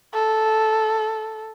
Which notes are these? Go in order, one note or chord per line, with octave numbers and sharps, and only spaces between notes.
A4